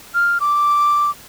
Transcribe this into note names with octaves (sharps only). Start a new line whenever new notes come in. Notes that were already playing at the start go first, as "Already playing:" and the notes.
F6
D6